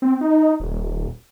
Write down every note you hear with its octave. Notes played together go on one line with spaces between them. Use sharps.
C4
D#4
D#1